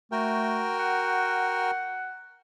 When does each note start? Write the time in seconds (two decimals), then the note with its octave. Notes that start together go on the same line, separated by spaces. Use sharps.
0.12 A3 F#4 A#4 G5
0.79 F#5